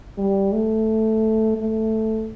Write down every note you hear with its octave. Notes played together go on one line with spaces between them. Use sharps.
G3
A3
A3